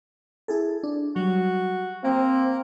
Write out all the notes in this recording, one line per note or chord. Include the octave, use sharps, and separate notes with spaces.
E4 G#4 A4
D4
F#3 G3 F#4
A#3 C4